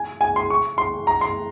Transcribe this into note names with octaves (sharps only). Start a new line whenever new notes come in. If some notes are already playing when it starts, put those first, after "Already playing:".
Already playing: G#5
G#5
C6
C#6
C6
A#5
C6